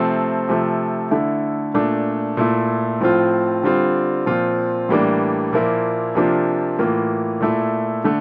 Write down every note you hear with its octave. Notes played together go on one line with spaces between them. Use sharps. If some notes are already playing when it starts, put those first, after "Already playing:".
Already playing: C3 F3 A3 C4
C3 F3 A3
D3 A3 E4
A#2 A3 D4
A#2 A3 E4
A2 F3 C4 F4
D3 G3 C4 F4
A#2 F3 C4 F4
A2 E3 G3 A#3 D4
A#2 F3 A#3 E4
C3 F3 A#3 D4 F4
A2 E3 A#3 F4
A#2 A3 E4
D3 A3